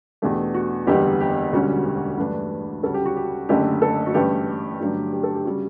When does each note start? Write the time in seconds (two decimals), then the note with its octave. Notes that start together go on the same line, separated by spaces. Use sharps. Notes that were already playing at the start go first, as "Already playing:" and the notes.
0.22 E2 B2 A3 D4 G4
0.54 F#4
0.87 F#1 E2 D3 G3 B3 G4
1.21 G4
1.52 E1 D2 D3 G3 C#4 F#4
1.86 G4
2.18 G2 E3 A3 D4 B4
2.83 D2 C#3 G3 C#4 A4
2.94 G4
3.06 F#4
3.16 G4
3.49 F#1 F#2 D3 A3 G4
3.82 A4
4.07 F#4
4.14 G2 E3 A3 C#4 G4
4.80 G2 D3 F#3 A3 D4
5.13 G4
5.23 A4
5.35 G4
5.45 C#3 G3 F#4